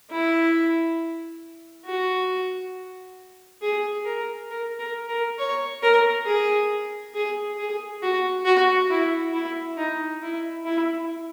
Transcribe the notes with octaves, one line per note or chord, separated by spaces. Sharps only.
E4
F#4
G#4
A#4
A#4
A#4
A#4
C#5
A#4
G#4
G#4
G#4
F#4
F#4
E4
E4
D#4
E4
E4